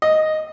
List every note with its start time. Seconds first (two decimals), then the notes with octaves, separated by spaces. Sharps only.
0.02 D#5